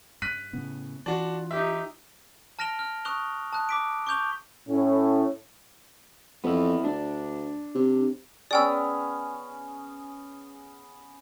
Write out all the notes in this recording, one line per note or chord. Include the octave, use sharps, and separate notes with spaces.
G2 F#6 B6 D#7
A2 C#3 B3
E3 D4 F4 F#4
D#4 G4 E5
A5 F6 A#6 D7 F7 G7
F6
C#6 D#6 F#6 F7 G7
A5 D#6 F#6
D6 B6 D7
C#6 D6 G6 F7 G7
A2 C#4
F2 B3 E4
D2 D4
C3
B3 C#4 G#4 D5 G5 E6